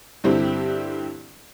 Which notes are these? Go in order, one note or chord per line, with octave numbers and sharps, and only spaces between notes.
G2 D3 C4 E4 G4